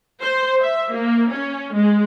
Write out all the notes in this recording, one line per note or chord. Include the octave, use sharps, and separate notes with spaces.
C5
E5
A#3
C#4
G#3